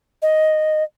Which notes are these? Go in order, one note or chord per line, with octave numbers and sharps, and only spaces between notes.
D#5